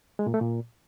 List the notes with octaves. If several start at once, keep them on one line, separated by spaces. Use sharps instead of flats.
G#3
A#2
A3
A#2